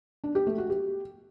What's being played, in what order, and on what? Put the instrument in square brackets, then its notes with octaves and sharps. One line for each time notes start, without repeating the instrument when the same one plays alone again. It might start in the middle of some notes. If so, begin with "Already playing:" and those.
[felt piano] D4
G4
A3
F#4
G4